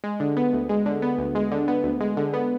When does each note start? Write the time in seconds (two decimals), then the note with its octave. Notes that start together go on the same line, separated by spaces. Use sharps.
0.04 G#3
0.20 D3
0.37 B3
0.53 D2
0.69 G#3
0.86 D3
1.02 B3
1.19 D2
1.35 G#3
1.51 D3
1.68 B3
1.84 D2
2.01 G#3
2.17 D3
2.33 B3